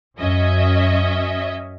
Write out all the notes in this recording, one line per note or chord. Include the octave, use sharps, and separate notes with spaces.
F#2 C#4 D#5 E5